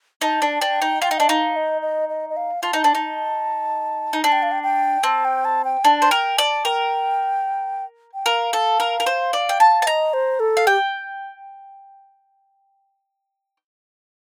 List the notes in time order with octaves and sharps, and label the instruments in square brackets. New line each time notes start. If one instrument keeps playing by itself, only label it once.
[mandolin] D#4 [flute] A5
[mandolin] D4
[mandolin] D4 [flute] G5
[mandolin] D#4
[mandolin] F4 [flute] G5
[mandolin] D#4
[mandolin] D4 [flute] D#5
[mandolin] D#4 [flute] F5
[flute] D#5
D#5
D#5
D#5
F5
[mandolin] F4 [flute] A5
[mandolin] D#4
D4
D#4
D#4
[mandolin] D4 [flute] A5
[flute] G5
F5
G5
G5
[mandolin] C4 [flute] A5
[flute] G5
A5
G5
[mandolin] D4 [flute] A5
[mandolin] C5
[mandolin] A#4 [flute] G5
[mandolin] D5 [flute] A5
[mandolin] A#4 [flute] G5
[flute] G5
[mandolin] A#4 [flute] F5
[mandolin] A4
A#4
A#4
C5
D5
G5
A5
A5
[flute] D#5 [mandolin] A#5
[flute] C5
A4
[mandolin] F5
[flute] G4 [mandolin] G5